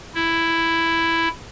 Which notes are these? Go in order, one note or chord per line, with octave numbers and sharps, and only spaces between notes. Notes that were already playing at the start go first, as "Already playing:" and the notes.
E4